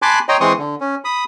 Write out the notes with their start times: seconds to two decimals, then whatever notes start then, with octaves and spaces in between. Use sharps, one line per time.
0.02 G#5 A5 B5 C6 D6 F#6
0.29 C#5 D#5 G5 A#5 C6
0.40 E3 G#3 C4 C6 C#6 D#6
0.59 D3
0.81 C#4
1.05 B5 D#6